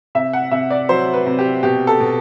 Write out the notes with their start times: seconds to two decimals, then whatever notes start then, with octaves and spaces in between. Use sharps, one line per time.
0.15 C3 E5
0.33 F#5
0.52 C3 E5
0.70 D5
0.89 F#3 C5
1.13 B4
1.26 C3
1.39 G4
1.63 B2 G4
1.87 A4
2.00 B2